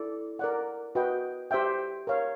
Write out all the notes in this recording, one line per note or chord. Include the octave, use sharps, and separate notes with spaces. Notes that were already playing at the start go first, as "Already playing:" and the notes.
Already playing: E4 A4 D5
A#4 D5 F#5
F#4 B4 D#5 G5
G4 C5 E5 G5
A#4 C#5 F5